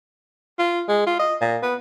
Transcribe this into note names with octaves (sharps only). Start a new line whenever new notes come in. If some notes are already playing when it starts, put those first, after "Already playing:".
F4
G#3
F4
D#5
A#2
B3